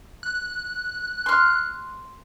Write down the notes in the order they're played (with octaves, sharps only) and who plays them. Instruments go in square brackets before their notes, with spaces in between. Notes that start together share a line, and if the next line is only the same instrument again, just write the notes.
[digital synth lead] F#6
[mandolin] C6 F6